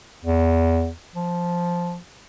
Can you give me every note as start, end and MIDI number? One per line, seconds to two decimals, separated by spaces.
0.25 0.89 40
1.15 1.98 53